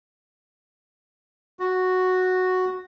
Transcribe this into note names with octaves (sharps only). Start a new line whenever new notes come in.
F#4